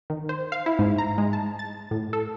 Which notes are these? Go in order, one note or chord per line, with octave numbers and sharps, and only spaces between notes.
D#3
C5
F5
E4
G#2
A#5
G#3
A5
A6
A2
A4